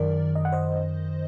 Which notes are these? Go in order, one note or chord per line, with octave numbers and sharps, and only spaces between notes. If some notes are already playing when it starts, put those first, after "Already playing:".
Already playing: F#2 D#3 A#4 D5
D#5
F#5
C5 D#5